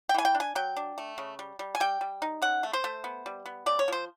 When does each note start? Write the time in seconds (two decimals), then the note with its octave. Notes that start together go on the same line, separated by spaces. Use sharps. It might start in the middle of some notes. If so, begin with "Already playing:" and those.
0.09 G5
0.14 E3 G#5
0.25 G5
0.35 D4
0.40 G#5
0.55 F#3 G5
0.77 D4
0.98 A3
1.18 C#3
1.39 G3
1.59 G3
1.75 G#5
1.80 G3 G5
2.01 G3
2.22 D#4
2.42 C#3 F#5
2.63 A3
2.73 C5
2.84 A3
3.04 B3
3.26 G3
3.46 B3
3.66 C#3 D5
3.79 C#5
3.88 F3 C5